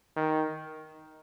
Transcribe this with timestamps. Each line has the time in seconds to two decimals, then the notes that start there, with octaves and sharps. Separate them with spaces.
0.16 D#3